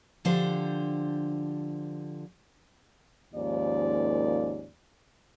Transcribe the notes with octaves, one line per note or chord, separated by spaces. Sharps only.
D3 F3 D4 G4 C5
D#2 G#2 F3 A#3 C#4 D5